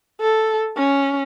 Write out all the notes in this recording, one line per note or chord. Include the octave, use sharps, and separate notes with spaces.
A4
C#4